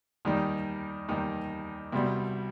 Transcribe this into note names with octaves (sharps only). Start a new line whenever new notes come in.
D#2 D#3 G3 D#4
D#2 D#3 G3 D#4
C2 B2 G3